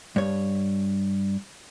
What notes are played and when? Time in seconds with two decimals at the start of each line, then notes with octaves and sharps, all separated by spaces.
0.16 G2 C#5